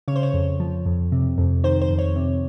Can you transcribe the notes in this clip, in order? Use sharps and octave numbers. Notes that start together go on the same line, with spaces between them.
C#3 C#5
C5
C#5
F2
F3
F2
C3
F2
D#3 C5
C5
F2
C#5
C3